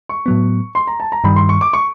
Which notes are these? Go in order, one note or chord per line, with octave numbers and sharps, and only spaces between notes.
C#6
A2 F#3 B3
C6
A#5
A5
A#5
G2 D#3 G3 B5
C6
C#6
D6
C#6